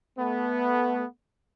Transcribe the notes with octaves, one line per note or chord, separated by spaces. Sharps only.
A3 B3